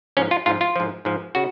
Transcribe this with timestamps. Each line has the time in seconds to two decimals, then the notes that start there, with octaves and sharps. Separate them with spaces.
0.17 G#2 F3 C#4
0.31 F4
0.46 G#2 F3 F4
0.61 F4
0.76 G#2 F3
1.05 G#2 F3
1.35 C#3 F#4